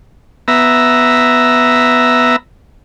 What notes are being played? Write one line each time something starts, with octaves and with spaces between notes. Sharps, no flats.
B3 E5 A#5